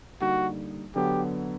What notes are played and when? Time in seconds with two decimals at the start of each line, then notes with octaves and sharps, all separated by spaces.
0.21 D3 G3 A#3 D#4 F#4
0.96 D3 F#3 B3 G4